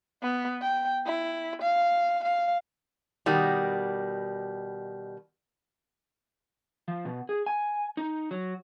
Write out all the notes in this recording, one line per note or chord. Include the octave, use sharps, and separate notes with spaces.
B3
G5
E4
F5
F5
B2 D#3 G3
F3
B2
G#4
G#5
D#4
F#3